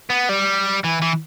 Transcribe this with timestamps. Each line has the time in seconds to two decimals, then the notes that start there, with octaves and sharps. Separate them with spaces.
0.10 B3
0.29 G3
0.84 E3
1.02 E3